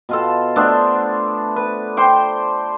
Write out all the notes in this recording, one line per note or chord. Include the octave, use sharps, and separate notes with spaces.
B2 F4 A4
A3 B3 D4 C5
B4
C5 G5 D6